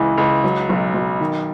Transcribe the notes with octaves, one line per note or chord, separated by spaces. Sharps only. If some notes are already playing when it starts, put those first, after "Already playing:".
Already playing: C#2 E3
C#2
F#3
B1
B1
D#3